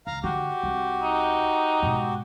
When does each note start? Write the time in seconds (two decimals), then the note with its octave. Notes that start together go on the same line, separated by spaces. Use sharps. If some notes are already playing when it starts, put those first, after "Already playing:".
0.07 C#2 F5 A#5
0.24 D3 F#4 G4
0.63 C2
1.03 D#4
1.83 G#2 B2